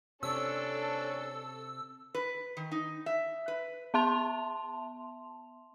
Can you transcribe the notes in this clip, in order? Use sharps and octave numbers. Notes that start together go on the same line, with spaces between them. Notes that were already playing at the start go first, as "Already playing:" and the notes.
C3 C#4 D4 A4 C#6 E6
B4
D#3
D#4
E5
B4
B3 E5 A5 C6 F7